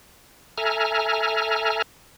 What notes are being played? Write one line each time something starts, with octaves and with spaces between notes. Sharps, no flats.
A4 E5 G#5 A#5 F6